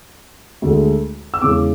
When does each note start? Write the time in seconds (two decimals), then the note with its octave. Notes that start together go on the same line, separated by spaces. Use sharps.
0.62 D2 D3 G#3
1.34 E6
1.42 E2 C#3 G#3 D6